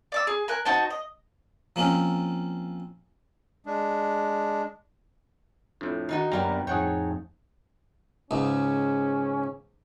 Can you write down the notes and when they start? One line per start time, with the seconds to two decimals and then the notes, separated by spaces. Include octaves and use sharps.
0.12 D5 D6 E6
0.27 G#4
0.48 A#4 G#5 F#6
0.65 D#4 F#4 C5 A5
0.90 D#5
1.76 F3 A#3 C4 C#4
3.66 G#3 D4
5.81 F2 A2 D4
6.09 D#3 D#4 F#4
6.32 G1 F#2 G3 A#3 B3 A#4 G5 A#5
6.67 F2 A2 F3 D#4 G#4 C#5 F#5 G5
8.31 C#2 G#2 C#4